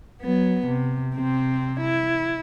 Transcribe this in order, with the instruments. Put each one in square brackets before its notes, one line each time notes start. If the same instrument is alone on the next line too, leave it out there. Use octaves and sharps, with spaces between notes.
[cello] F#3 B3
C3
C3 C4
E4